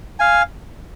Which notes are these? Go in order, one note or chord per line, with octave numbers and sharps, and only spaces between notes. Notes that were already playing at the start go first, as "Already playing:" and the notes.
F5 G#5